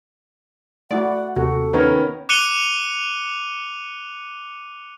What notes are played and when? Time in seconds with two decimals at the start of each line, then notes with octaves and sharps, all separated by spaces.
0.91 A3 E4 F#4 D5 F#5
1.36 D#2 C3 F#4 A4
1.73 D#3 B3 C#4 A#4 C#5
2.29 D6 F#6 C#7 D#7 F7 G7